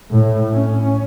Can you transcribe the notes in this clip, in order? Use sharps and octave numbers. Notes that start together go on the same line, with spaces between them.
A2
C#4